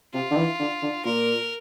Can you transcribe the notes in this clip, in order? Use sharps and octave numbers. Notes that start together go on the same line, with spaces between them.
C3 F4
D3
E3
D3
D3
A#2 A#4